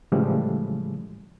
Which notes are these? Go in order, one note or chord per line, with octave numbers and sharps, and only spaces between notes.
A2 C#3 E3 F3 G3 G#3